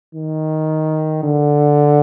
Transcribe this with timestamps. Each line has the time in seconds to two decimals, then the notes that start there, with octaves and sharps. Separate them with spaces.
0.15 D#3
1.24 D3